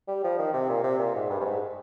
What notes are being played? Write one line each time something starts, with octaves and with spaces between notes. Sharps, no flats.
G3
F3
D#3
C3
A#2
C3
A#2
G#2
G2
G2
G#2